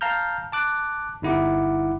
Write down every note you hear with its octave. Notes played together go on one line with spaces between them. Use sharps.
F5 A5 A#5 F6 G6
A5 D6 F#6
G1 D#4 E4 F#5 D6